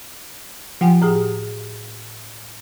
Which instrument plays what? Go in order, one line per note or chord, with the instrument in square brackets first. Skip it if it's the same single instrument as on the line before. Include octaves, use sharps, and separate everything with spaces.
[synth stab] F3 G4 [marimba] F#5 G#5
[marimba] A2 G#4 D#6